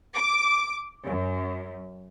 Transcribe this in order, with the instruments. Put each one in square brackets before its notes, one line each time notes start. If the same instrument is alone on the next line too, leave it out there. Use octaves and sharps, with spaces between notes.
[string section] D6
F#2